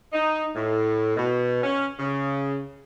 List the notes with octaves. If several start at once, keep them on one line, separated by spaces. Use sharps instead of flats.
D#4
A2
B2
C#4
C#3